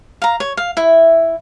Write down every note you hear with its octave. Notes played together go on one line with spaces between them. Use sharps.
F5 A#5
C#5
F5
E4 E5